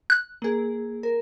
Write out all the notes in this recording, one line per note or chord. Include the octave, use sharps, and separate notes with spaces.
F#6
A#3 G#4
A#4